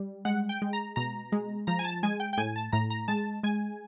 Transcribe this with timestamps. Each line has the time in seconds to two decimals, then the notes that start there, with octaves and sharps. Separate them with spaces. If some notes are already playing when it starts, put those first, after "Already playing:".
Already playing: G3
0.25 G#3 F#5
0.49 G5
0.62 G#3
0.73 A#5
0.96 B2 A#5
1.32 G#3
1.67 F3 A#5
1.79 G#5
1.85 A5
2.03 G#3 G#5
2.20 G5
2.33 G5
2.37 A2 G#5
2.56 A5
2.72 A2 A#5
2.90 A#5
3.08 G#3 A5
3.43 G#3 G#5